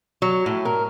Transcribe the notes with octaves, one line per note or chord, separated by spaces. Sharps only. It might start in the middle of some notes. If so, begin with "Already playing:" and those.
F#3
A2
A#4